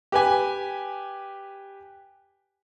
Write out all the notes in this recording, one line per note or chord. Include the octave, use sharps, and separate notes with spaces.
G4 B4 G#5